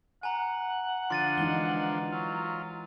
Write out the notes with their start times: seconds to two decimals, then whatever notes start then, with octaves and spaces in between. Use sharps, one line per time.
0.23 F#5 G#5 A#5
1.10 D3 F3 C6 A6 D#7
1.38 E3 G#3 D#4 G7
2.12 F#3 F4